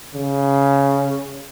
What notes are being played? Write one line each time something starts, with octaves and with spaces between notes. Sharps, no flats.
C#3